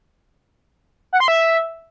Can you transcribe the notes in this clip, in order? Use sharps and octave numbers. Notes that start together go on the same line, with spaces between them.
F#5
C6
E5